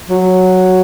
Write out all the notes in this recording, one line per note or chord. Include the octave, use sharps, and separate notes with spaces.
F#3